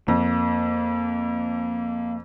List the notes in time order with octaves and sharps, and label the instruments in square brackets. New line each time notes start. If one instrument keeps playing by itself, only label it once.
[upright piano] F2 [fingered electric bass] A#3